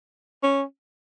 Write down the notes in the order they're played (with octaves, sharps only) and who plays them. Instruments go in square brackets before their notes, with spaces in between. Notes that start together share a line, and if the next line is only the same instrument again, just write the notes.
[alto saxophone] C#4